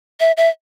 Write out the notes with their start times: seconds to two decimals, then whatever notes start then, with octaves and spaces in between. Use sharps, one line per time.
0.20 E5
0.37 E5